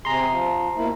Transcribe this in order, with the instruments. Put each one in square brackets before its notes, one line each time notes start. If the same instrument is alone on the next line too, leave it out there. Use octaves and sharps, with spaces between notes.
[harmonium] C3 G#4 [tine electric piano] A#5 C6
[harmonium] F3
B2 A#3 E4